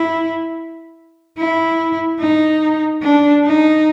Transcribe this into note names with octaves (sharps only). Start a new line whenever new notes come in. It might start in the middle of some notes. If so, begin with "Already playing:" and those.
Already playing: E4
E4
D#4
D4
D#4